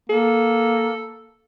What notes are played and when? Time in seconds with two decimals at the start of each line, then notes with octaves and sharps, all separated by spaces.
0.10 A#3 A4